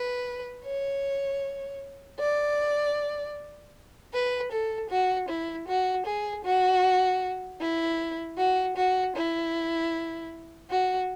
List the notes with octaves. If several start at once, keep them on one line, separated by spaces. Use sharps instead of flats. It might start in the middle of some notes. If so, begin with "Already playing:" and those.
Already playing: B4
C#5
D5
B4
A4
F#4
E4
F#4
G#4
F#4
E4
F#4
F#4
E4
F#4